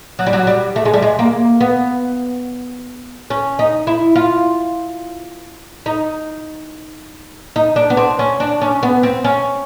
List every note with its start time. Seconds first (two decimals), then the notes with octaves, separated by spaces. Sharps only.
0.19 F#3
0.27 G3
0.33 F#3
0.47 G3
0.76 A3
0.85 G#3
0.94 G3
1.02 G#3
1.19 A#3
1.61 B3
3.30 C#4
3.59 D#4
3.87 E4
4.16 F4
5.86 D#4
7.56 D#4
7.76 D4
7.90 B3
7.97 C4
8.19 C#4
8.40 D4
8.62 C#4
8.83 B3
9.03 C4
9.25 C#4